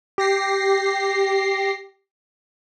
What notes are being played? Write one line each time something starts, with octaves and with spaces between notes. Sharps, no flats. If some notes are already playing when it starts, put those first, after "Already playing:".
G4 A#6 C7